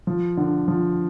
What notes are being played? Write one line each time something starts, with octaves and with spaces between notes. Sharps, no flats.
F3
D3
F3